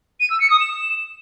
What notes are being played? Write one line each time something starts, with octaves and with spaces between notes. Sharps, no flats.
D#7
E6
C#7
D#6
E7